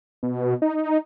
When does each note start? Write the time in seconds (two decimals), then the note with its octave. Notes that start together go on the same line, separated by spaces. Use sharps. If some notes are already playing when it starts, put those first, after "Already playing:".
0.23 B2
0.62 D#4